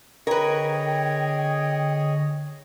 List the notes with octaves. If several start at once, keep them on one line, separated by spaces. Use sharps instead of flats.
D3 G#4 A#4 B4 C#5 D#5 G5